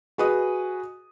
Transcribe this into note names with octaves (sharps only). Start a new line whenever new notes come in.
F#4 G#4 B4 D#5 D#6